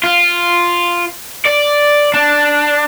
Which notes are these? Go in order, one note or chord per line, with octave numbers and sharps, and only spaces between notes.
F4
D5
D4